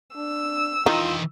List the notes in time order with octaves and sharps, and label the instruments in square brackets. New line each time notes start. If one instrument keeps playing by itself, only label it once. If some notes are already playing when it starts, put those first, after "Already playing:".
[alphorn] D4 [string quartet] E6
[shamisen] D#3 D#4 [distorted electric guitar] E3 D#5 [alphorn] F4